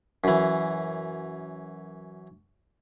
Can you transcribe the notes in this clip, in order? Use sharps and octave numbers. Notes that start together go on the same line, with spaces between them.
F#2 E3